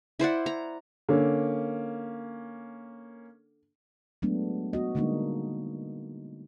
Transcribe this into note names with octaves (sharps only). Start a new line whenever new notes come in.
E4 C5 D5 F#5
A#5
D3 A#3 C#4
F#3 G#3 A3 B3 D4
B3 F#4 D#5
D3 G3 G#3 A#3 D4 D#4